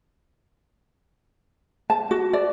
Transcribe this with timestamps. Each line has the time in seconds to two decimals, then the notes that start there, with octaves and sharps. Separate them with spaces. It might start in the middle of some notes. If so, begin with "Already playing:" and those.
1.90 A5
2.11 F#4
2.33 D5